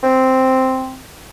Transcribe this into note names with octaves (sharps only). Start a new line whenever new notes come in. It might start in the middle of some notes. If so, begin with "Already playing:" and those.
C4